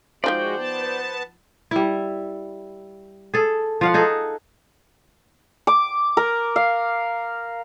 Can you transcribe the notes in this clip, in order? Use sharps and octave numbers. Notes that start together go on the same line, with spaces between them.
F3 G#3 D#4 F4 F#4 C5 D5 G5
B3 A5
G3 E4
G#4 A4
F3 F5 F#5
D#4 G#4 A4
D6
A#4
F5